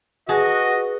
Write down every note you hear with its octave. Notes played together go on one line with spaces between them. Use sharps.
F#4 G#4 B4 D#5 A5